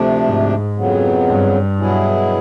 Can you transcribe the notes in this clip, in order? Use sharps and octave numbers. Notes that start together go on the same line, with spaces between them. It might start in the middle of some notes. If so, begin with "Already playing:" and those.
Already playing: D2 C3 F3 A3 D4
G#2
F2 C#3 F#3 B3
G2
B2 F#3 B3 E4 G#4